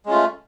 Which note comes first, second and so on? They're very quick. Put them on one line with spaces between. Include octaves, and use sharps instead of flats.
G#3 C#4 F4 A3